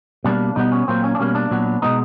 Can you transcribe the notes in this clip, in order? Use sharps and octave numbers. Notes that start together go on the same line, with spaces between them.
B2 G3 A#3 D4
B2 G3 B3 D#4
C#4
A#2 F#3 A#3 C4
C#4
D4
B2 G3 A#3 C#4
D4
A#2 F#3 B3
B2 G#3 B3 D#4